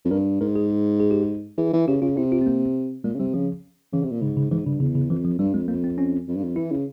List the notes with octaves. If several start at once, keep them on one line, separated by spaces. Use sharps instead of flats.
F2
G2 A#4
G#2 A#4
G#4
G#4
G4
G#4
E3 G#4
E3
C#3 G4
C#3 F4
C3 E4
F4
C4
A#3
A#2 G#3
C#3
C3 G3
C#3 F3
C#3 E3
C3
A#2
G#2 C#3
C#3
G#2 E3
G2 C#3
E2 C#3
C#3
F2 E3
F3
G2 G3
F2 G#3
F2 A#3
C4
C#4
F2
G2
F2
E3 E4
C#3